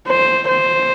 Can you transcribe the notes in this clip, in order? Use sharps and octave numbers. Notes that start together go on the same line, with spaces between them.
C5
C5